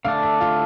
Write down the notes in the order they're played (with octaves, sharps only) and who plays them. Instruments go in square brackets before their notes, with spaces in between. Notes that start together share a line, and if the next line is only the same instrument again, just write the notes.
[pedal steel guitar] D3 A3 D4 [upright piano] F5
[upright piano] E5
F4